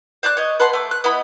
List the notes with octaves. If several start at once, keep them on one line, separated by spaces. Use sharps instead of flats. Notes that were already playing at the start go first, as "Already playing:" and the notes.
C5 D5 D6 F#6
C#5 D#5
B4 F#5 A5 C6
A3 D6
F#6
B3 E4 D#5 B5